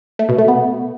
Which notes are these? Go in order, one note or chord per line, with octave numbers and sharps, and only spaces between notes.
A3
B2
A3
B3